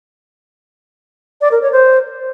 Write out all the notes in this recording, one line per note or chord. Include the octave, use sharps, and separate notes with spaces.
D5
A#4
C#5
C5